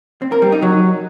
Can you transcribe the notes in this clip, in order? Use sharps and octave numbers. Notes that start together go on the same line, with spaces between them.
C4
A#4
G3
D#4
F#3